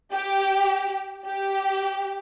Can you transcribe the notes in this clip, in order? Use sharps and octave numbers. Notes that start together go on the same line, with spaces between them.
G4
G4